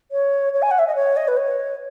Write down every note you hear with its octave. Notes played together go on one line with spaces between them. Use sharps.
C#5
C#5
G#5
F#5
E5
D#5
C#5
D#5
B4
C#5